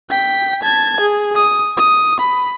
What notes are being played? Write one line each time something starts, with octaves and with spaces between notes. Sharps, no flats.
G5 B6
A5 G#6
G#4
D#6
D#6
B5